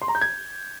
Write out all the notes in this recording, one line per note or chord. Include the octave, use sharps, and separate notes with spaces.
C6
A#5
G6
G#6